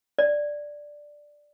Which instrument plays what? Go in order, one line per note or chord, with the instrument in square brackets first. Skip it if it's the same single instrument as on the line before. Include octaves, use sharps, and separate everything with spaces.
[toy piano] D5